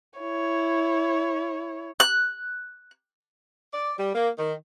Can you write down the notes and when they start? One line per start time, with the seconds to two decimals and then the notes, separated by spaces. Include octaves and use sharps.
0.19 E4 C#5
2.00 F#6
3.73 D5
3.98 G3
4.15 A#3
4.39 D#3